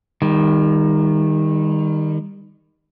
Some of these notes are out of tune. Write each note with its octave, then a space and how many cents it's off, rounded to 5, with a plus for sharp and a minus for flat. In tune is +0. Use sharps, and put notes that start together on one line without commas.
D#3 +0 G3 +35